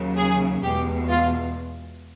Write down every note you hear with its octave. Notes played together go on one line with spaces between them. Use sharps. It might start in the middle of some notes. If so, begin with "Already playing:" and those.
Already playing: D#2 C#3 F#3
G#4
E2 B2 G#3 G4
F4